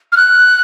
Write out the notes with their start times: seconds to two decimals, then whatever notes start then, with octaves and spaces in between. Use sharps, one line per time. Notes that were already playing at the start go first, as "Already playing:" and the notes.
0.12 F6
0.17 F#6